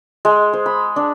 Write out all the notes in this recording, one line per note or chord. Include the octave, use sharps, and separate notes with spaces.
G#3
C5
B5
D4